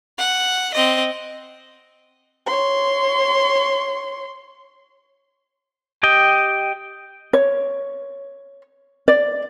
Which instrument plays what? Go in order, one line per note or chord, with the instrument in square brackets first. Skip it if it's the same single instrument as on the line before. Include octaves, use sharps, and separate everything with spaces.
[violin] F#5
C4 D#5
[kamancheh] C#5 C6
[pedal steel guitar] G4 D#5 G5
[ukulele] C#5
D5